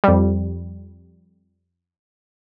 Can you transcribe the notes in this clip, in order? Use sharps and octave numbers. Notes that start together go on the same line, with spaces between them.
F2 G3